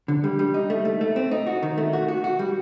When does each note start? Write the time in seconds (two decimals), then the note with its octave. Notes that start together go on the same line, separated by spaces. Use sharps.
0.08 D3
0.24 G3
0.39 G3
0.54 D#4
0.70 A3
0.85 A3
1.01 A3
1.16 C4
1.31 D#4
1.47 F#4
1.63 D#3
1.78 A3
1.93 F#4
2.08 F#4
2.24 F#4
2.39 G3